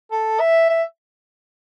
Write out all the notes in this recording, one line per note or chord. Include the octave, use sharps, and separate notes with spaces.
A4
E5
E5